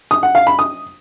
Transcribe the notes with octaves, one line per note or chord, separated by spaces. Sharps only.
D#6
F#5
F5
B5
D#6